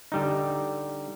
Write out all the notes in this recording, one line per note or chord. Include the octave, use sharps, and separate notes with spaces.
D3 G3 D#4